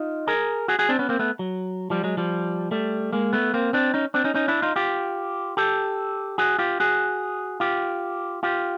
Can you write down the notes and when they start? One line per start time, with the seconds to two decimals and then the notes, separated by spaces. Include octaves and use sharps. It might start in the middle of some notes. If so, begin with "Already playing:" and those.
Already playing: D#4 F4
0.27 G#4 A#4
0.68 F#4 G#4
0.79 F#4 G#4
0.89 C4 D4
0.99 B3 C#4
1.09 A#3 C4
1.19 A3 B3
1.39 F#3
1.90 F3 G3
2.04 F#3 G#3
2.17 F3 G3
2.71 G3 A3
3.13 G#3 A#3
3.33 A3 B3
3.54 A#3 C4
3.73 C4 D4
3.94 C#4 D#4
4.14 C4 D4
4.24 C#4 D#4
4.35 C#4 D#4
4.48 D4 E4
4.62 D#4 F4
4.76 F4 G4
5.57 G4 A4
6.38 F#4 G#4
6.59 F4 G4
6.80 F#4 G#4
7.60 F4 G4
8.43 F4 G4